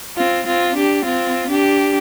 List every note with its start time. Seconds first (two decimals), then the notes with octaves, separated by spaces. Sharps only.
0.16 C4 F4
0.46 C4 F4
0.75 D4 G4
1.04 C4 F4
1.50 D4 G4